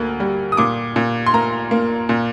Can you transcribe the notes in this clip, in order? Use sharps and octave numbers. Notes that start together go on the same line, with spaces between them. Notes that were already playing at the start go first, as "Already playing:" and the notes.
Already playing: D2 A#3
G3
D#6
A#2 D6
A#2
C6
A#3 A#5
A#3
A#2